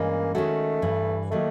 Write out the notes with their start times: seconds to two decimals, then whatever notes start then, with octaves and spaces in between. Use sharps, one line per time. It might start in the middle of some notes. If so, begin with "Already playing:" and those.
Already playing: G2 E3 G#3 A#3 C#4
0.34 D#3 G#3 A3 C#4 F#4
0.82 G2 E3 G3
1.31 D#3 F#3 A3 A#3